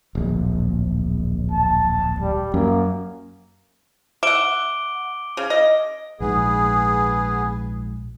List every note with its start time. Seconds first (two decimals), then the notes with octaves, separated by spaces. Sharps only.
0.15 D1 A#1
1.51 A5
2.20 G3
2.54 F#2 A#3
4.23 E5 F#5 D6 D7 G7
5.37 C#3
5.50 D#5
6.20 A#1 G#2 B3 G#4